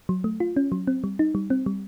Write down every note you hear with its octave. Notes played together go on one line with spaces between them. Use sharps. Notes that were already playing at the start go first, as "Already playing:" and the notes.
F#3
A3
F4
C#4
F#3
C4
G3
D#4
G3
C4
G3